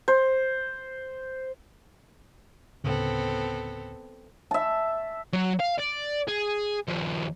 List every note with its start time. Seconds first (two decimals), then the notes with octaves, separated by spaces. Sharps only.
0.08 C5
2.84 D2 A2 C#3 B3 C4 A4
4.51 E5 A5
5.33 F#3 F#4
5.59 F5
5.78 D5
6.28 G#4
6.88 D#2 F3